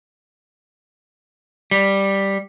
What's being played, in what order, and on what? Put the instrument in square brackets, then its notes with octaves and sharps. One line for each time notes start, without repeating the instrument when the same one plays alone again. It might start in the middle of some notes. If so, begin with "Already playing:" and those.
[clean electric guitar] G3